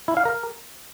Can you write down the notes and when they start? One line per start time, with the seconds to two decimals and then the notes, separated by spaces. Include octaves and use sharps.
0.08 E4
0.17 F5
0.25 A#4